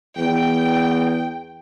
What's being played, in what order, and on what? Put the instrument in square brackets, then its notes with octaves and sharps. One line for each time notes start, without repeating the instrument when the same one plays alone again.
[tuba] E2 [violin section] G5